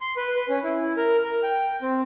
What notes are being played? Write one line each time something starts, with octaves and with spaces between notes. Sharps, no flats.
C6
B4
B4
C#4
E4
A#4
A#4
G5
C4